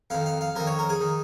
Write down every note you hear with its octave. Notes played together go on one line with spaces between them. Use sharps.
F2 D#3 F5
F5
F5
F2 D#3 A#4
C#5
A#4
G#4
D#3